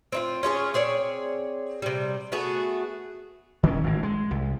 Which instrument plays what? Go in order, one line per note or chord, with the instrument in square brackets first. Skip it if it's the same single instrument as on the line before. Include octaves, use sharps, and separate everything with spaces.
[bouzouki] C4 D#4 F4
C#4 F4 G#4 C#5
C4 G#4 C#5 D5
C3 G3
A3 B3 F#4 G#4
[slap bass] D#3 E3 A#3 C#4
G#1 A2
G#3
C2